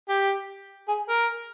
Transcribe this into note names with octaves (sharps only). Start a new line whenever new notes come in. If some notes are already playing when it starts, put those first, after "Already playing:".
G4
G#4
A#4